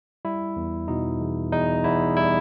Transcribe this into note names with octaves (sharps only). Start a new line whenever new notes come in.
G3 E4
E2
B2 D#4
E2
E2 D#4
E2 E4
G3 E4